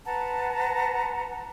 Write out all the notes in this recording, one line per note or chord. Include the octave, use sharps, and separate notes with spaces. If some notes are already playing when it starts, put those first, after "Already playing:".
B4 F#5 A5 A#5